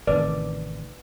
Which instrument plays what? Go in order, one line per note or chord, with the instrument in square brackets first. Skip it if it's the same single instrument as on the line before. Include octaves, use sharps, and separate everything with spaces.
[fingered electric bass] A1 C3 D#3 [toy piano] B4 [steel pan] D5